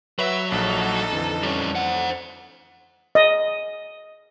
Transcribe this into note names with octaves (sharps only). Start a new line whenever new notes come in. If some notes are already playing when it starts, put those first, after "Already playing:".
F#3 B4 E5
A#1 D#4 A4
F2 D3 E3
G3 C#4
C5 F#5
D#5